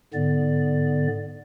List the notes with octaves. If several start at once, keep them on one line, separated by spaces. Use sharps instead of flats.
G#2 D3 B3 D5